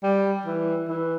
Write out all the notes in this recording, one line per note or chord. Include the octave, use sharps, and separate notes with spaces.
G3
E3
E3